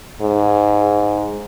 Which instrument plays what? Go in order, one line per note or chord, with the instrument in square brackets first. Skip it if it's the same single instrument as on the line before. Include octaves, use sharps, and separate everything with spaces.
[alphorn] G#2